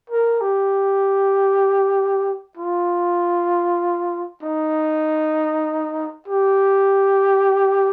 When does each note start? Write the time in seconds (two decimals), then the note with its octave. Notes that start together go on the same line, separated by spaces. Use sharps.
0.10 A#4
0.41 G4
2.57 F4
4.43 D#4
6.28 G4